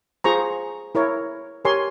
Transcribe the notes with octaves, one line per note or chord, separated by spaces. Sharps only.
F4 G#4 C5 A#5 C#6
E4 A#4 C#5
G4 A#4 C#5 G#5 C6